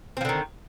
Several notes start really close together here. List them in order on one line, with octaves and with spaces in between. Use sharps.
C4 F3 D3 D#3